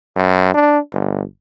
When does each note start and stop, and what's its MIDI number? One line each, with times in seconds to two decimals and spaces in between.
0.16 0.52 42
0.54 0.78 62
0.93 1.22 31